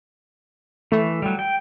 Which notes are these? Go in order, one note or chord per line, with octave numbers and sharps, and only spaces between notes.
E3 A3
F#3 G3
G5